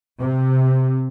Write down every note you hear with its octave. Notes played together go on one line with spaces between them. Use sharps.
C3